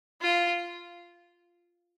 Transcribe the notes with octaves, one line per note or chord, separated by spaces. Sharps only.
F4